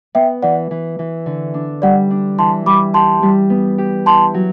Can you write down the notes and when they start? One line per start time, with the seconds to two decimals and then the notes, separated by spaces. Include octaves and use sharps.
0.15 B3 E5 G5
0.42 E3 D5 F#5
0.71 E3
0.99 E3
1.26 D3
1.54 D4
1.82 G3 D5 F#5
2.11 D4
2.38 E3 A5 C6
2.66 G3 B5 D6
2.94 G4 A5 C6
3.23 G3
3.50 B3
3.78 G4
4.06 E4 A5 C6
4.34 F#3